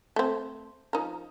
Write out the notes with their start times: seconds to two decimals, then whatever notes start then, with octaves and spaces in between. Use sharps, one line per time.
0.16 A3 C4
0.93 F3 D#4 A#4